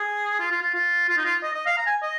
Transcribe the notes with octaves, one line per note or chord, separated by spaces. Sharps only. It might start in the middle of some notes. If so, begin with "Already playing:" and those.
Already playing: G#4
F4
F4
F4
F4
F4
D#4
F4
D#5
D#5
F5
A#5
G#5
D#5